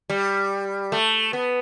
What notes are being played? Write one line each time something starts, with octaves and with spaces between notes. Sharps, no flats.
G3
A3
B3